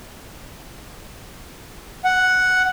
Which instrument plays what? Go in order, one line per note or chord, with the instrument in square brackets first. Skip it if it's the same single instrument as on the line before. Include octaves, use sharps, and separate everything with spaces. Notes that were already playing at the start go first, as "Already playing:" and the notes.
[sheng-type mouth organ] F#5